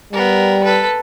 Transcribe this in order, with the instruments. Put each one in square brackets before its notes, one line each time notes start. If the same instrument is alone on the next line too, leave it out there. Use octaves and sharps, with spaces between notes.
[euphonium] G3 [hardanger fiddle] B3 A#4
[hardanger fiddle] A4 B4